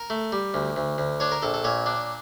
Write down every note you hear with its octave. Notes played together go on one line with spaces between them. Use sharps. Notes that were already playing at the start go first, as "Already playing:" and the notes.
Already playing: A#4
A3
G3
D2
D2
D2
D4 C#5
A#4
A#1 A4
A4
A#2 C#5
D4